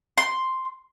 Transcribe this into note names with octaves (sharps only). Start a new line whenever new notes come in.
C6